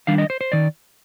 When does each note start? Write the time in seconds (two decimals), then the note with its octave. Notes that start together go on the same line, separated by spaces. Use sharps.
0.07 D#3 G3 D4 F5
0.18 D#5
0.30 C5
0.41 C5
0.52 D#3 D5